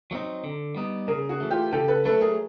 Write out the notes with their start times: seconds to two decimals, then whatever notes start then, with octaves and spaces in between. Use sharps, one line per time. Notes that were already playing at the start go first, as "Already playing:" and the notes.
0.11 F#3 A3 C4 D#4
0.44 D3
0.76 G3 B3 D#4
1.08 C#3 G#4 A#4
1.29 F#4 G#4
1.40 E3 A3
1.50 F4 G4
1.72 C#3 G4 A4
1.88 A4 B4
2.05 F#3 A3 A4 B4
2.21 G#4 A#4